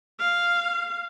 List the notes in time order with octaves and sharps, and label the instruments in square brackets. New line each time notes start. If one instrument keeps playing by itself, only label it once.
[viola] F5